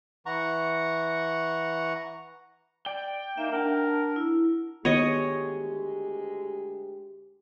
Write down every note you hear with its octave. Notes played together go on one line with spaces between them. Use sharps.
E3 F#5 A#5 C#6
D5 G5
A#3 D#4 E5
D4 A#4 F#5 A5
E4
D2 D#3 G#3 B3 G4 C#5 D#5